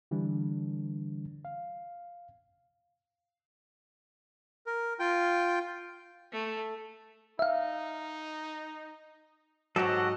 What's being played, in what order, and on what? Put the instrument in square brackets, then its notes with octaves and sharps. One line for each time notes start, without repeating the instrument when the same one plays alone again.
[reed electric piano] D3 E3 G3 D4
F5
[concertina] A#4
F4 G5
[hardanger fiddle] A3
[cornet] D#4 [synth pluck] E5 F5
[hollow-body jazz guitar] G#2 F#3 [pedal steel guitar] F#4 G4 A4 [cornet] D#5